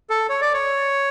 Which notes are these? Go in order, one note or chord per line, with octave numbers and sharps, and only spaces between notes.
A4
C#5
D5
C#5